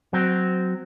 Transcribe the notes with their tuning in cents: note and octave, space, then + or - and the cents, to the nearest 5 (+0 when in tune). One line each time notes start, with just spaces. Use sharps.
F#3 +0 C4 -10